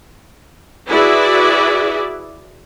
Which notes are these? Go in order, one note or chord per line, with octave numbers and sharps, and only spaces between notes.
E4 F#4 G#4 B4 D5 E5